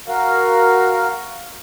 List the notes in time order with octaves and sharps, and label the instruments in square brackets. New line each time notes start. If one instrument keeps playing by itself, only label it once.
[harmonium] F#4 A#4 F5